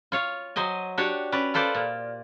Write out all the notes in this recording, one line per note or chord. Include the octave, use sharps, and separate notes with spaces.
F4 C#5 F5
F#3 C5 D#5 G#5
D4 F#4 G4 C#5
C#4 B4 D5
F4 A4 B4 C5 D5
A#2